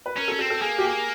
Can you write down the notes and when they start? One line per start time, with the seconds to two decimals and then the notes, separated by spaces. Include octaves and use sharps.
0.06 B4
0.16 C#4 A#4
0.28 A4
0.32 C#4
0.39 C4 A4
0.50 A4
0.61 A#3 G#4
0.78 G4
0.85 G#4